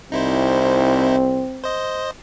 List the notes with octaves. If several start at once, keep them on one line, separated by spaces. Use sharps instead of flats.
C2 C4 D#4 E4 C5
C5 D#5